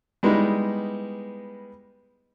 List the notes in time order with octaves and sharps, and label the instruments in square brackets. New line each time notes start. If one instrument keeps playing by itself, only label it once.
[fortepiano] G3 G#3 B3 D#4 E4